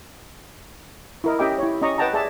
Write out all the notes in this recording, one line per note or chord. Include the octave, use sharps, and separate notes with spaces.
E4 A#4 D#5
C#4 G4 D#5 E5 G5 D6
E4 C#5
C#4 G4 D#5 A#5 C#6
B4 D#5 F#5 G5 A5 A#5
G#4 D5 E5 A5